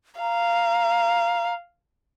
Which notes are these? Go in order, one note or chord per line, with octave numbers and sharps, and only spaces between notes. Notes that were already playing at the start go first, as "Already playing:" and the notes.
F5 A#5